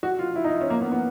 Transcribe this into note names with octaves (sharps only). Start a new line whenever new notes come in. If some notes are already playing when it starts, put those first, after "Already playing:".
F#4
F4
E4
D#4
C#4
A#3
B3
B3